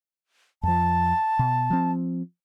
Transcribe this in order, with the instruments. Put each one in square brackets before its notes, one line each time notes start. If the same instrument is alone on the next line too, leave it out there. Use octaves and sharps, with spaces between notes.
[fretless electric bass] F2 F3 [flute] A5
[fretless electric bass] B2
F3 C4